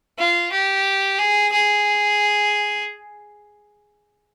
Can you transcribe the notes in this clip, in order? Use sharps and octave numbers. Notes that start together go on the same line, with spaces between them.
F4
G4
G#4
G#4